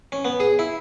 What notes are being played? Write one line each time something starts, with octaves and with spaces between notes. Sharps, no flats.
C#4
B3
G#4
E4